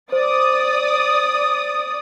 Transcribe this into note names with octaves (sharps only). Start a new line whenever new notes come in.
C5 D5 D#6